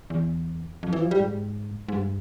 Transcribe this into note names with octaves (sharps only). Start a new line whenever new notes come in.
E2
F2
E3
F3
G3
G#2
G#2
G2